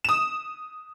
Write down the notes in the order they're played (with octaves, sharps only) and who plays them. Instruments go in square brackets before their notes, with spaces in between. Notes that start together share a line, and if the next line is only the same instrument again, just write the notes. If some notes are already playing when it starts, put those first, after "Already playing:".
[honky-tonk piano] D#6 E7